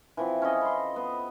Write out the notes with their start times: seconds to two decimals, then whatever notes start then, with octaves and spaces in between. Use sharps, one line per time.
0.17 E3 F3 C4
0.42 C#4 A4 D#5
0.61 B5 C6
0.96 B3 D#5